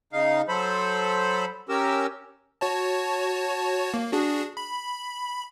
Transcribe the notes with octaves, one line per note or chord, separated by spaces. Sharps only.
C#3 D#4 F5
F#3 A4 C5 B5
C#4 G4 A#4 E6
F#4 C#5 A5
A#3
D4 F#4 G#4
B5